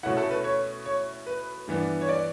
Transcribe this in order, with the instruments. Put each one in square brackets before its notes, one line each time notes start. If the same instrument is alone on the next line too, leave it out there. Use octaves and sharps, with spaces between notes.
[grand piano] B2 A3 C#4 E4 F#5
A4
B4
C#5
C#5
B4
G2 E3 B3 D4
C#5
D5